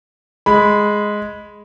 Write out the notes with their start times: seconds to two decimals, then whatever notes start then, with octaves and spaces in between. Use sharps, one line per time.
0.46 G#3 B5